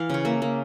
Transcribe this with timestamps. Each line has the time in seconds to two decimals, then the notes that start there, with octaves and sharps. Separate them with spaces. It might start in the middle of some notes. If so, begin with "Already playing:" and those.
Already playing: E3 F5
0.10 C#3 C#5
0.25 A#3 E5
0.42 A#3